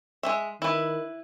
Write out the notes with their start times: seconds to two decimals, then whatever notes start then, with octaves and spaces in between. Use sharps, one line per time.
0.23 G#3 C#4 E5
0.62 D#3 E4 B4